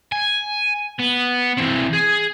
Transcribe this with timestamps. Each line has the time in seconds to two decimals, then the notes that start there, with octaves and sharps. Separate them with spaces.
0.12 G#5
1.00 B3
1.57 E3 C4
1.93 G#4